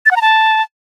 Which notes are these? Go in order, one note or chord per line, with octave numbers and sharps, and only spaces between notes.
A6
F#5
A#5
A5